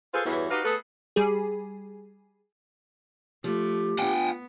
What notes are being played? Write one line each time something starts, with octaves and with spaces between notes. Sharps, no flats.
F4 G#4 A4 B4 C5
E2 G2 E3 F#4 C#5
D#4 F#4 G4 B4 F5
A3 B3 G#4 A4 B4
G3 G#4
F3 A3 G4
B3 D4 F4 F#5 G5